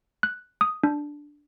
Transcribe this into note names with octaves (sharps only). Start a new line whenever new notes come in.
F#6
D#6
D4